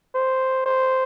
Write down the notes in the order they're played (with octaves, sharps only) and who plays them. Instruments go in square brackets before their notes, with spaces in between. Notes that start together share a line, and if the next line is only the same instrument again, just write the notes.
[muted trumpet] C5
C5